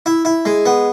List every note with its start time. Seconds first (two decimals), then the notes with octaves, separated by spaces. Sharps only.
0.06 E4
0.25 E4
0.45 G#3
0.66 B3